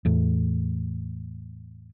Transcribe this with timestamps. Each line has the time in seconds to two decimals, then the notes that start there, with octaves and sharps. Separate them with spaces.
0.05 E2 A2